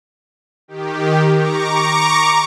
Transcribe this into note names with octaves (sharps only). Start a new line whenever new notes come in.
D#3 G4
A#5 C#6 D6